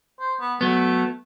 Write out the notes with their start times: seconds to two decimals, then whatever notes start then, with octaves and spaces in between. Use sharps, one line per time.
0.20 C5
0.40 B3
0.61 F#3 A3 B3